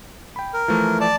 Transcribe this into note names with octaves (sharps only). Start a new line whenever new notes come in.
G5 B5
A#4
E3 F3 A3
D5 A5